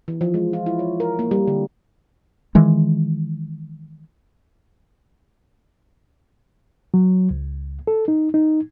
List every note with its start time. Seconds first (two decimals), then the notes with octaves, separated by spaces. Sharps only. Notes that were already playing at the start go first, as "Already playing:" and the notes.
0.08 E3
0.21 F3
0.34 G#3
0.53 F4
0.66 E4
0.79 C#5
1.00 A#4
1.19 A#3
1.31 G3
1.47 D3
2.55 D#3 E3 G#3
6.94 F#3
7.31 C#2
7.87 A4
8.08 D#4
8.34 D#4